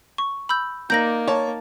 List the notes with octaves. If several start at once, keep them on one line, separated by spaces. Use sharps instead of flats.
C#6
B5 E6 G6
A#3 D#4 D5 A#5 G6 A#6
C#5 A5